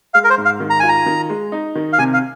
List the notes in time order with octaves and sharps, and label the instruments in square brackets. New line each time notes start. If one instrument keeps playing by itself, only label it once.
[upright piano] G#3 [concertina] F5
[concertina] A#4
C5
[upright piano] G#2
[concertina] F5
[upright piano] D#3
[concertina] A#5
[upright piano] F4 [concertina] G#5
[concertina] A#5
[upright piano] D#3
G#3
D#4
D#3
[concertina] F5
[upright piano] C3 [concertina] G#5
[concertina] F5